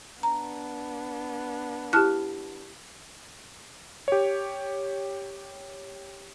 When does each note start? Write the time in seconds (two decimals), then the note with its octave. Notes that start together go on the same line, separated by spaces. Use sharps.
0.23 B3 D4 A#5
1.93 E4 G4 A5 F6 F#6
4.08 G4 C#5